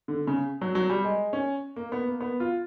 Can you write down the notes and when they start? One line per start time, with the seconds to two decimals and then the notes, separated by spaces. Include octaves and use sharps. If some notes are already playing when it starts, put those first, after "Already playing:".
0.08 D3
0.27 C#3
0.61 F#3
0.75 F#3
0.90 G3
1.04 G#3
1.33 C#4
1.76 A#3
1.92 B3
2.06 A#3
2.20 B3
2.40 F4